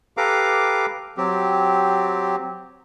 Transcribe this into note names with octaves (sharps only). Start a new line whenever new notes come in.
G4 A4 B4 F5 A#5 D6
F#3 C4 G4